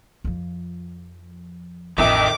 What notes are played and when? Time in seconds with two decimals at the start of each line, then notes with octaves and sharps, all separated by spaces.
0.24 F2 F3
1.98 A1 F2 D#3 D4 E5 D6